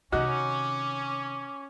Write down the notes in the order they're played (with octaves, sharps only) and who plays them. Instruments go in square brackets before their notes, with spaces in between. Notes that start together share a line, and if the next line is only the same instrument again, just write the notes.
[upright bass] C3 D#3 [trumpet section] C#4 [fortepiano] D#4 F#4 F#6 [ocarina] D6